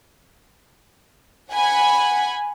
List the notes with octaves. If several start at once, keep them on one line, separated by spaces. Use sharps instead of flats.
F#5 G#5 B5